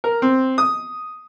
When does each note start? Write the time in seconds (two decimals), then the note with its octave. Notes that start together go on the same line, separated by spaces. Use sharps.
0.04 A#4
0.22 C4
0.58 D#6